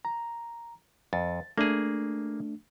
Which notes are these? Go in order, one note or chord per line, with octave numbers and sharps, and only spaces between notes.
A#5
F2 A6
A3 A#3 D4 G#4